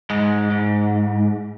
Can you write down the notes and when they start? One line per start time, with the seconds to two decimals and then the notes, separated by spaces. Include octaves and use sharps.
0.10 G#2 G#3
0.50 G#2